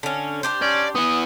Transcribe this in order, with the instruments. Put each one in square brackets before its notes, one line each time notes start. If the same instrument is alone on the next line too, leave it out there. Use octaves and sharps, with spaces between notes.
[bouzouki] D3 C#4
D4 G4 C5
[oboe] C#4 [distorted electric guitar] D5
[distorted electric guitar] B3 E4 [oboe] D#6